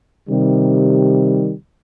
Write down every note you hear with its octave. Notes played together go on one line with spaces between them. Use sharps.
C3 D#3 G3